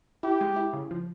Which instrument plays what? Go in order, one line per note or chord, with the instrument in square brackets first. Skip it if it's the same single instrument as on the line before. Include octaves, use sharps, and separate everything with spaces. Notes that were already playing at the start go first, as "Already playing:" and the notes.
[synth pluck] E4 [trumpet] G4
[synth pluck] G#3
E4
C#3
F3